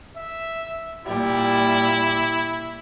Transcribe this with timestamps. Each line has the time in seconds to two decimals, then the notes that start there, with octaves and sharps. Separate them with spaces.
0.16 E5
1.06 A#2 G3 E4